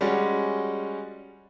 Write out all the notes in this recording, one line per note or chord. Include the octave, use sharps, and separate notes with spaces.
G3 G#3 C#4 F#4